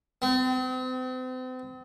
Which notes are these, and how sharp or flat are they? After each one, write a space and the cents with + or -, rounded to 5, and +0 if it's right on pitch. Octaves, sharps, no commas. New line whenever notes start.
C4 -40